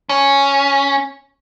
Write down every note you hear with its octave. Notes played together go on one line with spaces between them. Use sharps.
C#4